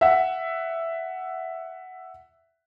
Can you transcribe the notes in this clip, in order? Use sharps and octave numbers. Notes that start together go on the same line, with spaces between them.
E5 F#5